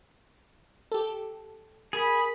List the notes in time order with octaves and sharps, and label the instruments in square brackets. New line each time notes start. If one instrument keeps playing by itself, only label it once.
[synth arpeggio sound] G4 A4
[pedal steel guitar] G#4 [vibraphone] A#4 [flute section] B5